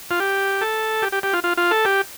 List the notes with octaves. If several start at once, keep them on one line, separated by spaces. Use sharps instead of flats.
F4
G4
A4
G4
G4
G4
F4
F4
F4
A4
G4